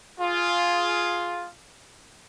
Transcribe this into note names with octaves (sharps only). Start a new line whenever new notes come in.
F4 G#4